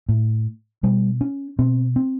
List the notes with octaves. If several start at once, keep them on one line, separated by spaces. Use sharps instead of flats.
A2
B2 G3
C#4
B2 C4
C4